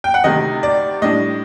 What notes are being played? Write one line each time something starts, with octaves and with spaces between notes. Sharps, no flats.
G5
F#5
D2 C3 D#3 D#5
D5
A2 G3 D4 D#5